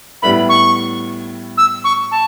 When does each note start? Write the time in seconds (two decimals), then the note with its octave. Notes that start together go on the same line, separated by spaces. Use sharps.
0.22 A2 G3 B3 E4 B5
0.49 C#6
1.58 E6
1.84 C#6
2.11 A5